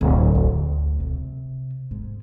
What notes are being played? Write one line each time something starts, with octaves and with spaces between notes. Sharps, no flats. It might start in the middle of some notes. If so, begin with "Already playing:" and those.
D1
D2
C3
G#2